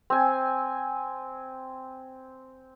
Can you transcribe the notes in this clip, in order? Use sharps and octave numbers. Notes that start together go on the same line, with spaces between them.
C4 G#5